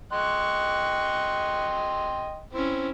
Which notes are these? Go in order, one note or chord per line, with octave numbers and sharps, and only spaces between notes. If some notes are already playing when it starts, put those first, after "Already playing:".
D#5 G5 C6 C#6 F#6
C4 C#4 E4